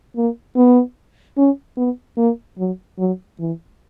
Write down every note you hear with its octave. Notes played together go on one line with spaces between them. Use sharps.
A#3
B3
C#4
B3
A#3
F#3
F#3
E3